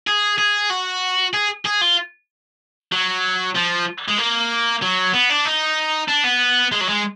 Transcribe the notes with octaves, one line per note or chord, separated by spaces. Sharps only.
G#4
G#4
F#4
G#4
G#4
F4
F#3
F3
G#3
A#3
F#3
B3
D4
D#4
D4
B3
G#3
F#3
G#3